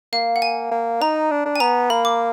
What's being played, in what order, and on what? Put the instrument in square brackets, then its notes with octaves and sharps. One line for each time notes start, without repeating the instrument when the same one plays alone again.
[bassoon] A#3 [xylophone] F5
[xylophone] F#5
G#5
[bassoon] A#3
[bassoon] D#4 [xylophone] A#5
[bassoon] D4
D4
[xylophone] G#5
[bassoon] B3 [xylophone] A#5
[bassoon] A#3 [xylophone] B5
[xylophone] D6